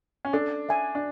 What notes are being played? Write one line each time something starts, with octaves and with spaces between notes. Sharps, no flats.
C#4
D4 A4
E5 G#5
D4